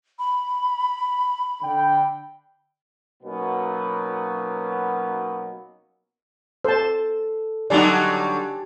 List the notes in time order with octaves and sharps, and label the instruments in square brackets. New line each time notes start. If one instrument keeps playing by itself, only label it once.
[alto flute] B5
[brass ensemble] D3 G5
[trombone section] B2 F#3 A#3 B3 C#4 D#4
[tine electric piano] A4 [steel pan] C5 A5
[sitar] D3 F#3 G3 [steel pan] D#4 D5 [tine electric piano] G4 G#5 A5